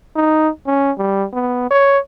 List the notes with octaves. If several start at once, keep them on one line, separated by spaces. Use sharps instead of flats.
D#4
C#4
G3
B3
C#5